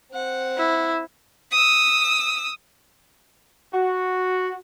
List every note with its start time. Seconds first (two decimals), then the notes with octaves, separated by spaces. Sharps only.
0.12 C4 F#5
0.58 E4
1.51 D#6 E6
3.73 F#4